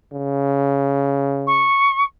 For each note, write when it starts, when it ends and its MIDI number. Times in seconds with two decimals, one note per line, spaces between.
0.14 1.72 49
1.47 2.03 85